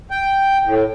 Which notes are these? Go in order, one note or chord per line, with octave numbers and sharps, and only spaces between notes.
G5
A2